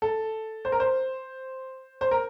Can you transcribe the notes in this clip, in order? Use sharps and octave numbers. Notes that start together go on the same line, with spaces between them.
A4
C5
A#4
C5
C5
A#4